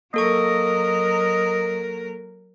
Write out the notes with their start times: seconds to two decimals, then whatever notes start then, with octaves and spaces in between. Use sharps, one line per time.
0.14 F#3 A#3 A4 A#4 D#5 C#6